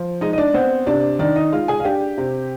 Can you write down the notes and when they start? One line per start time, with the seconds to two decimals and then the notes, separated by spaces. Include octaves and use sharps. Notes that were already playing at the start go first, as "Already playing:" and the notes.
Already playing: F3
0.21 G#3 D#4 D#5
0.33 D#5
0.38 D4 D5
0.54 B3 C4 C5
0.86 C3 D4 D5
1.19 D#3 D4 D5
1.36 D#4 D#5
1.52 G#3 F4 F5
1.68 G#4 G#5
1.80 F5
1.85 D4 G4 G5
2.18 C3